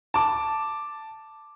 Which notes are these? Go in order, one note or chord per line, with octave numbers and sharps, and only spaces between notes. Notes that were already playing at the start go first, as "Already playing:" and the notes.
A5 D6